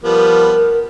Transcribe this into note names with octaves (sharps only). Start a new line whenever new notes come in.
F3 G3 B3 A#4